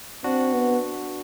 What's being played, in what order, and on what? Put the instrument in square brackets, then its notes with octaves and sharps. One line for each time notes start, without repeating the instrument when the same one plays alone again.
[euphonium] C4 [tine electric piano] D4 F#4
[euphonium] B3